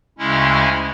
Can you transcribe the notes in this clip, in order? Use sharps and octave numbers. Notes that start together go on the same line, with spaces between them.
D2 C#3 G#3 C#4 E4